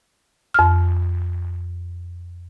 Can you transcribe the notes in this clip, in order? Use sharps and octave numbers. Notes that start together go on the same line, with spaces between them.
F2 F6